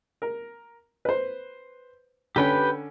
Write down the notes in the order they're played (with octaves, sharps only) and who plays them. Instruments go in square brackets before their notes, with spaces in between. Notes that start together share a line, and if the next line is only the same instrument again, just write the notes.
[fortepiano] A#4
B4 C5
[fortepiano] D3 C#4 [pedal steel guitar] G4 B4 G5